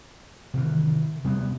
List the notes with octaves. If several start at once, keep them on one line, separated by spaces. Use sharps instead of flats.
C3 D#3 E3
C3 G3 B3